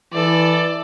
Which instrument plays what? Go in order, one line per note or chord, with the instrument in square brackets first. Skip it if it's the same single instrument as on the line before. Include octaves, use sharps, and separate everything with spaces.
[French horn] E3 [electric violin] A4 D5